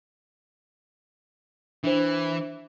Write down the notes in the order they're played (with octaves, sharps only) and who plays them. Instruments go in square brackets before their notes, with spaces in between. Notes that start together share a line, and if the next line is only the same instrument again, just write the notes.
[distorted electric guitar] E3 [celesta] D4 C5